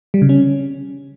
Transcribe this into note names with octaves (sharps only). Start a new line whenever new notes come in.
G3
C#3
C#4